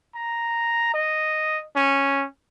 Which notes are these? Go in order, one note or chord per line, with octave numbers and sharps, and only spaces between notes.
A#5
D#5
C#4